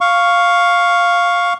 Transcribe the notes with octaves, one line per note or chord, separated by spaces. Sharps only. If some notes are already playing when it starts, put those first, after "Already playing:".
F5 C#6